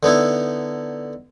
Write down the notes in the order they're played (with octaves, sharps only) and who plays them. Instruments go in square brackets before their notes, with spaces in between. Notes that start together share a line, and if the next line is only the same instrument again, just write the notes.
[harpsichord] D3 B3 D#4 E4